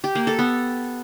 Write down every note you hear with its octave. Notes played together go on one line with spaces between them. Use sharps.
G4
A#3
A4
B3